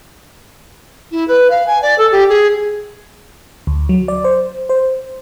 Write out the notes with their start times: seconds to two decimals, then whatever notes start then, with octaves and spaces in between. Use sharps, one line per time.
1.11 E4
1.28 B4
1.50 F5
1.66 G#5
1.82 D5
1.98 A4
2.11 G4
2.29 G#4
3.67 D2
3.89 F#3
4.08 D5
4.24 C5
4.69 C5